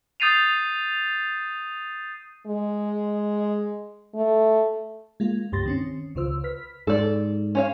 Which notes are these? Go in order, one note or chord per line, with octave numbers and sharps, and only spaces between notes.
D#6 G6 A6 C7 D#7 F7
G#3
A3
G#3 A#3 F4
C#2 G2 G4 C6 A6 A#6
D#3 C4 C#4
C#2 C#3 F4 C5 E6
B4 F6 B6
G#2 A4 D5
C#4 C#5 F5